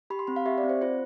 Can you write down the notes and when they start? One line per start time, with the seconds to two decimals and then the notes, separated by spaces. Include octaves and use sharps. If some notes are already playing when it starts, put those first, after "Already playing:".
0.10 G4 B5
0.19 C6
0.27 C4 B5
0.36 F5
0.46 G4 E5
0.58 D5
0.64 C4
0.69 C5
0.81 F4 C5